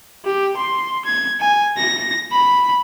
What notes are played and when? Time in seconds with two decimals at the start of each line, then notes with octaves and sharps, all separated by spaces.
0.25 G4
0.57 C6
1.05 G#6
1.40 G#5
1.77 A#6
2.31 B5